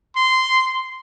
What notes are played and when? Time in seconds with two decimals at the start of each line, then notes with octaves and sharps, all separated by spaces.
0.16 C6